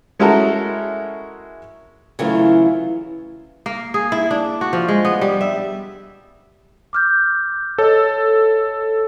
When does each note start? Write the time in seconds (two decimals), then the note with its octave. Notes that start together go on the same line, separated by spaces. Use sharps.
0.20 G#3 C#4 E4 F#4 A4 A#4
2.19 C#3 E3 F#3 A3 F4
3.66 A#3
3.94 G#4
4.12 E4
4.31 D4
4.61 F#4
4.73 F3
4.88 G#3
5.05 B3
5.21 G3
5.41 E5
6.93 D6 F6 G6
7.78 A4 C#5 D#5 E6